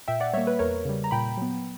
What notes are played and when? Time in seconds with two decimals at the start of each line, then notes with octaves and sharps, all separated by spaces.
0.08 A#2 E5 G5
0.20 D5 F#5
0.34 G3 A#3 C#5 E5
0.47 B4
0.59 E2 A#4 C#5
0.85 C#3 G3
1.04 A#5
1.11 A#2 G5 B5
1.37 F#3 B3